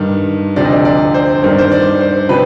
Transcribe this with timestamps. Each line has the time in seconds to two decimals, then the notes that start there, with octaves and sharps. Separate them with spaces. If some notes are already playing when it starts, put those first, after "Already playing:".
Already playing: G2 D#3
0.56 D2 C3 F3 D5
0.65 D#5
0.72 D5
0.85 D5
1.14 C5
1.43 G2 D#3 C5
1.51 D5
1.58 C5
1.71 D5
2.00 C5
2.29 C3 F3 B4